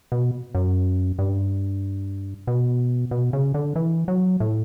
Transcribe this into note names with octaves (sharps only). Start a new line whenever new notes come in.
B2
F#2
G2
B2
B2
C#3
D3
E3
F#3
A2